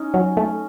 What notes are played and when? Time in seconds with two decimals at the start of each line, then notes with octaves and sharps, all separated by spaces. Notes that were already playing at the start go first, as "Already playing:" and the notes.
Already playing: C#4 D#4
0.14 F#3
0.37 A3